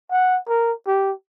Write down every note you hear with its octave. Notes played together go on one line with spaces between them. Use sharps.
F#5
A#4
G4